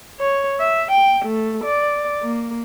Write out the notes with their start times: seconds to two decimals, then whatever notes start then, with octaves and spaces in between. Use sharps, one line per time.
0.20 C#5
0.60 E5
0.92 G5
1.25 A3
1.64 D5
2.22 A#3